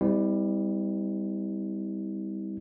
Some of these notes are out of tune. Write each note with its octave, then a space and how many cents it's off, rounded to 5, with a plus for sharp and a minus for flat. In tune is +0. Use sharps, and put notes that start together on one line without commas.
G3 +20 C4 -35 E4 -40